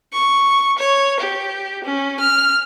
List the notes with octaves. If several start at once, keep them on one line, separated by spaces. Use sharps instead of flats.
C#6
C#5
G4
C#4
F6